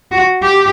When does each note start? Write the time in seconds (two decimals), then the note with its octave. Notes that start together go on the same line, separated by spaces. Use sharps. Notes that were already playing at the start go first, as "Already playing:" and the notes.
0.11 F#4
0.42 G4